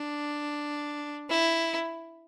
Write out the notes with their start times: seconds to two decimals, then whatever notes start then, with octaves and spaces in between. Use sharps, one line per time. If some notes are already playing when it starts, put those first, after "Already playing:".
Already playing: D4
1.30 E4